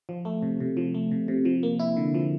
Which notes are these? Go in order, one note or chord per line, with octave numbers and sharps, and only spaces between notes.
F3
A3
C3
C3
F3
A3
C3
C3
F3
A#3
E4
D3
F3